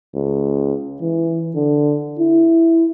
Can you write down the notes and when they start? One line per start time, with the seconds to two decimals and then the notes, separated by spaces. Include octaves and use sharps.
0.15 C#2
1.01 E3
1.55 D3
2.19 E4